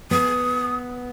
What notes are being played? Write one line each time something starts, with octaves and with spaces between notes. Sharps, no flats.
B3 D#6